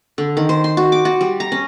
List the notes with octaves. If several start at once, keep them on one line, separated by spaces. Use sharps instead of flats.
D3
D#3
C5
C6
F#4
D6
F#4
G3
A#5
C#4